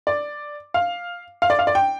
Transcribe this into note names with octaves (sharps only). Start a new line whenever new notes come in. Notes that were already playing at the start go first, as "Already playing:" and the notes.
D5
F5
F5
D5
F5
D5
G5